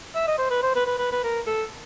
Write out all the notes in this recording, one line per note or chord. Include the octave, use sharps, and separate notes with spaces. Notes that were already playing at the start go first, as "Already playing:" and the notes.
E5
D#5
C5
B4
C5
B4
B4
B4
B4
A#4
A4